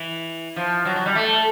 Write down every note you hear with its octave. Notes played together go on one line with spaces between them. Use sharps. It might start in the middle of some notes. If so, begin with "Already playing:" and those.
Already playing: E3
F3
F#3
F#3
G3
A3